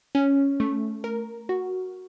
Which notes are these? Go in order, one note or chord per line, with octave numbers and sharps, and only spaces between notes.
C#4
A3
A#4
F#4